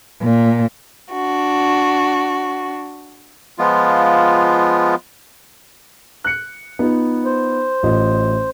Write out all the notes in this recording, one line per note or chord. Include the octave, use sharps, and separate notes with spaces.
A#2
D4 F#4
F3 G#3 B3 F4
F#6 C#7
B3 D#4 F4
C5
A1 F4 D#5